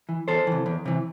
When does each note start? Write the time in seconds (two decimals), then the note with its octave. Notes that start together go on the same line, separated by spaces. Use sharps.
0.09 E3
0.28 E2 A4 C5
0.47 C3 E3
0.66 E2
0.85 C3 E3